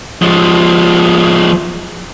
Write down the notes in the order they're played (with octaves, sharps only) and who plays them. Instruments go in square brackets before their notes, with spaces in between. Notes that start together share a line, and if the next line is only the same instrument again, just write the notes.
[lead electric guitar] F3 G#3